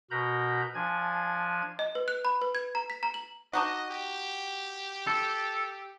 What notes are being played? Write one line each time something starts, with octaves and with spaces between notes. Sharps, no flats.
B2 F#4 A#4 A#5 B5 G6
F3 D4 G#5 G#6
D#5
B4
F#6
B5
B4
G#6
A#5
B6
A#5
F#7
D4 D#4 F#4 D#5
G4
A4